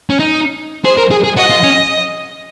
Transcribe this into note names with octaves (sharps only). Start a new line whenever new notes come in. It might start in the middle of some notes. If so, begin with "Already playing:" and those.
C#4
D#4
G#4 C5
A#4
G#4
G#4
F#4 D#5
F4
C#4